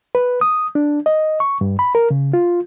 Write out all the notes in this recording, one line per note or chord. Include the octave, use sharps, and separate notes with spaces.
B4
D#6
D4
D#5
C#6
G2
B5
A#4
C#3
F4